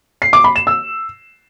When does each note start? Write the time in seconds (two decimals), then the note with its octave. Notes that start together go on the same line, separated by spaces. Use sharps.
0.22 C7
0.33 D6
0.44 B5
0.56 E7
0.67 E6